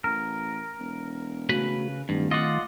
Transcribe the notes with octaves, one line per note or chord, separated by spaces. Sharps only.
A1 A#4
E1
C#3 A3 F#4 B4 B5
D1 G2 D#3 A3
F4 D5 D#5 F#5